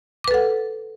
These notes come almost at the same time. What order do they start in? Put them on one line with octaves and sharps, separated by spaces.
D6 B4 A4 F#5